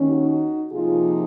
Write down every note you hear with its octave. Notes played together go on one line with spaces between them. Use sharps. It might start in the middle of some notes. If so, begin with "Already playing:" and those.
Already playing: D#2 D#3 A#3 C#4
D#4 F#4
C3 F3 A#3 D#4 F4 G#4